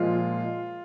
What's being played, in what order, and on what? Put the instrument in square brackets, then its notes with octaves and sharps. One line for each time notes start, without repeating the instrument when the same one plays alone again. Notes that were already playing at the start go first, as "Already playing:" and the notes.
Already playing: [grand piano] A#2 F3 G#3 F4